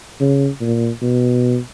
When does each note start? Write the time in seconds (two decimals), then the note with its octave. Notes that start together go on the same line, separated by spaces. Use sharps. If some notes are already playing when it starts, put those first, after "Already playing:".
0.20 C#3
0.61 A#2
1.01 B2